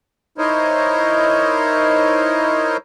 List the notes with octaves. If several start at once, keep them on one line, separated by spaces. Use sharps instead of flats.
D#4 E4 A#4 C5 C#5 D#5